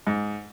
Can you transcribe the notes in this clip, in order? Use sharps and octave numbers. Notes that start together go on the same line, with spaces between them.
G#2